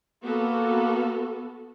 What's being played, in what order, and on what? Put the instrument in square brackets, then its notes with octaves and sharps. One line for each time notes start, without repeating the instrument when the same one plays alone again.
[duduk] A#3 [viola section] B3 F#4 A4